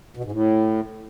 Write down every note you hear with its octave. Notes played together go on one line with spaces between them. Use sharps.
B2
G#2
A2